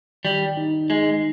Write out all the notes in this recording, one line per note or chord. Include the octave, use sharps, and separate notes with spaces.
D#3 G3
D#4
G#3 D#4